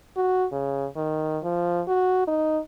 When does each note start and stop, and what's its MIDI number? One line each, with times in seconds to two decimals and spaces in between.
0.17 0.46 66
0.52 0.87 49
0.96 1.38 51
1.43 1.82 53
1.88 2.24 66
2.27 2.59 63